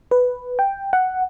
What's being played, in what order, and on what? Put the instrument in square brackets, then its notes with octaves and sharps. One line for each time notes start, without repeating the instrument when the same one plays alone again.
[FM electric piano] B4
G5
F#5